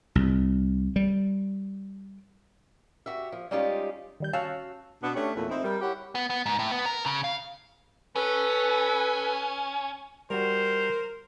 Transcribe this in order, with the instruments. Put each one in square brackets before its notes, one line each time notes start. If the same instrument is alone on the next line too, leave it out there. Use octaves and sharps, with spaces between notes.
[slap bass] C2
G3
[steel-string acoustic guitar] F#4 G4 E5
F3
G3 G#3 C#4 D#4 F4 G4
[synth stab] D#3 G3 G6
[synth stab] C#4 A5 E6 [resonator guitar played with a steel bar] F#4 F5
[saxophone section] B2 B3 D4
A3 C#4 D4 G4
E2 A#2 A3 B4
C4 D#4 E4
G3 A#4
E4 G4 C#5 F#5
[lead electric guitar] B3
B3
G#2
A2
B3
A#4
C#3
F5
[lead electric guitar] C#4 [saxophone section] A4 B4
[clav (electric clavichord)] G3 F#4 [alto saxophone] A#4 [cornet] C5